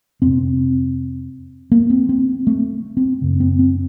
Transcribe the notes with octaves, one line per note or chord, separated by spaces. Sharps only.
F2 C3 C4
A#3
C4
C4
A3
C4
F#2 C#3
C4
C4